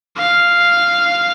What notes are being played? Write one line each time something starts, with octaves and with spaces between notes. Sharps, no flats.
F5